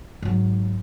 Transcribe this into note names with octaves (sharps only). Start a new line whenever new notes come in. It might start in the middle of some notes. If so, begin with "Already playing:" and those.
G#2 F#3